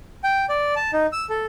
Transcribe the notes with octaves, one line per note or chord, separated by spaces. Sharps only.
G5
D5
A5
D#4
E6
A4